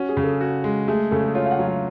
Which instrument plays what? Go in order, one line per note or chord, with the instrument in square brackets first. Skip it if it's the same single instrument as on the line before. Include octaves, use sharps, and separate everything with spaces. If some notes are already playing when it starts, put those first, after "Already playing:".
Already playing: [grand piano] C#4 [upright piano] F#4
[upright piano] G#4
[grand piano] C#3
[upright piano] A4
[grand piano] F#4
G#3
[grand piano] A3 [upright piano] G#4
[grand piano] C#3 [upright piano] A4
[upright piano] G#4
[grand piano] F4 [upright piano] C#5
[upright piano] F5
F#5
[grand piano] F#3
[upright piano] F5